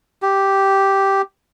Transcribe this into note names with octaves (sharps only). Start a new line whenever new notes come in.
G4